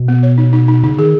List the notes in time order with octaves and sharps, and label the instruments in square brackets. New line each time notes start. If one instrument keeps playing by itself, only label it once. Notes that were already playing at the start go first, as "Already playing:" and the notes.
Already playing: [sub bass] B2
[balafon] B3
C#5
D#4
D#4
D#4
[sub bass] C#3 [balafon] D#4
[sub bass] D#3 [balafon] G#4